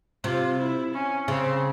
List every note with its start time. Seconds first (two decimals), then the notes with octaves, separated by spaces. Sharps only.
0.24 C3 F4
0.58 E4
0.93 C#4
1.28 C#3 C4